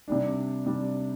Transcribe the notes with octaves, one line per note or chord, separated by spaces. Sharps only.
C3 G3 D4
C3 G3 D4